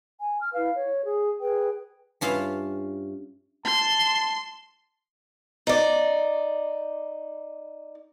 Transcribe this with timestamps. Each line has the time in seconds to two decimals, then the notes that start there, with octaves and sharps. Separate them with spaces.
0.19 G#5
0.40 F6
0.54 E4 B4 F5
0.74 C#5
1.05 G#4
1.40 G#4 B4 G5
2.21 G2 C#4 F4 E5 F5
3.65 A5 C6
5.67 D#4 D5